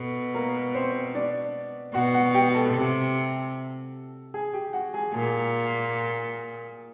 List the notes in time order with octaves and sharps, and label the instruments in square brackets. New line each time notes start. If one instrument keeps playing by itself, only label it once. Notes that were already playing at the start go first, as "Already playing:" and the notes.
Already playing: [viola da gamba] B2 [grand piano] A4
[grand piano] A#3 A#4
C4 C5
D4 D5
[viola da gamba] B2 [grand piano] F#4 F#5
[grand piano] F#4 F#5
G4 G5
A4 A5
[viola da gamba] C3
[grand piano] G#4 G#5
G4 G5
F#4 F#5
G#4 G#5
[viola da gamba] A#2 [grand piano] G#4 G#5